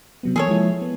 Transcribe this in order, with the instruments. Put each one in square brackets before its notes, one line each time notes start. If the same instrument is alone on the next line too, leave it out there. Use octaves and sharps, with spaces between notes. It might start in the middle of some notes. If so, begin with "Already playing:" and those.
[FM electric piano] C3 F#3 B3
[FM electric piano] E3 A#3 [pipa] G#4 A4 C#5
[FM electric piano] F3 G#3 E4
B3